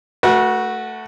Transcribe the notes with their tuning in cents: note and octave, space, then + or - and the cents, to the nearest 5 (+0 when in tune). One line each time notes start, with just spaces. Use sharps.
A3 +0 F#4 +0 B4 -40